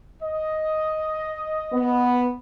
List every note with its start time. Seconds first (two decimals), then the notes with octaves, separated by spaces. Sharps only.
0.23 D#5
1.73 B3